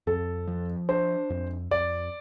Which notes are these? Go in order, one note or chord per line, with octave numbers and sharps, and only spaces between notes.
F2 A4
F3
D4 C5
F2
F2 D5